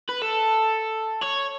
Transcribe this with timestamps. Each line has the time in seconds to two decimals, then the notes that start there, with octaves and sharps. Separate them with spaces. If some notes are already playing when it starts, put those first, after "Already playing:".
0.09 B4
0.22 A4
1.21 C#5